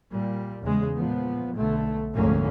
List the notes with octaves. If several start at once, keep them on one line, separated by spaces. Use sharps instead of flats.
A#2 G3
E2 C#3 G#3
A#2 F3 B3
B1 D3 A3
F1 D2 G#2 D3 A#3 C#4